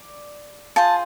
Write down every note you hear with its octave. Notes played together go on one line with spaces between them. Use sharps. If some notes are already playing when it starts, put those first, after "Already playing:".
Already playing: D5
F4 G#4 C5 A5